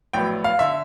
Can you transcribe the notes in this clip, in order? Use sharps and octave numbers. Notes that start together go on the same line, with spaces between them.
A#1 A2 F#3 B3 G5
F5
D3 E5